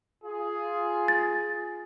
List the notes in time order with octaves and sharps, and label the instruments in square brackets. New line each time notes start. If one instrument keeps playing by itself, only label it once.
[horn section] F4 G#4
[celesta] A6